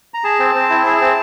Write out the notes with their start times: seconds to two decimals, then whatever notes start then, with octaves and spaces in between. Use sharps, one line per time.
0.14 A#5
0.24 G#4 A5
0.39 C4
0.55 C4
0.70 E4
0.86 G#4
1.01 C4